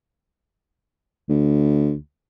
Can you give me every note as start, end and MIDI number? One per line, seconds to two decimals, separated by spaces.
1.29 1.95 38